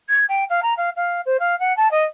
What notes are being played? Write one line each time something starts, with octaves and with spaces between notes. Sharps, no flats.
G#6
G5
F5
A#5
F5
F5
C5
F5
F#5
A5
D#5